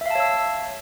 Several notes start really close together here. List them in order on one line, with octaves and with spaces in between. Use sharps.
E5 F5 A5 C#5 E6